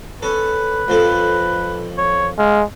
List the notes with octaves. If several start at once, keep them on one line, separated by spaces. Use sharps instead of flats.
C#4 A4 B4
F2 F3 A4
C#5
G#3 F5